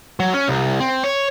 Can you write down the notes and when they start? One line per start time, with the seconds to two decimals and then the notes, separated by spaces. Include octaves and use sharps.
0.20 F#3
0.34 C#4
0.48 C2
0.80 C4
1.03 C#5